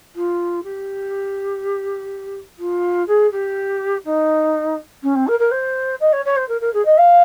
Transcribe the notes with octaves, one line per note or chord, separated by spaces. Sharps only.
F4
G4
F4
G#4
G4
D#4
C#4
C4
A#4
A#4
C5
D#5
C#5
C#5
C5
A#4
A#4
G#4
D#5
F5